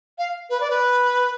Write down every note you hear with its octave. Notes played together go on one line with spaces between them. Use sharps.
F5
B4
D5
B4